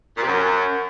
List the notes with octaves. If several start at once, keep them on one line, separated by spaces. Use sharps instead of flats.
A#2
C3
F#2